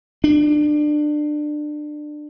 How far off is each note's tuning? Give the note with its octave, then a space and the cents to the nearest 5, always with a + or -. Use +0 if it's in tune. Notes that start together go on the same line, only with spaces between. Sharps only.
D4 +25